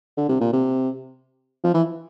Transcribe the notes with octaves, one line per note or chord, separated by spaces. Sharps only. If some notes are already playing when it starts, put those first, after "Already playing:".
D3
C3
A#2
C3
F3
E3